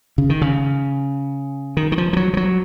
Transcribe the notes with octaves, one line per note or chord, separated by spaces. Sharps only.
C#3
D#3
C#3
D#3
D#3
F3
F3
F#3
F3
F#3